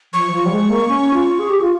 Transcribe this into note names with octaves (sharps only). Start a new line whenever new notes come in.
F3 C#6
F3
G3
G#3
A#3
C#4
F4
G#4
G4
F4